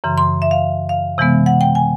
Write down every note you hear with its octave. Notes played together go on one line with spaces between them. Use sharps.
F#2 C#3 E3 C6
C6
E5
F5
F5
C3 E3 G#3 B3
F#5
G5
G#5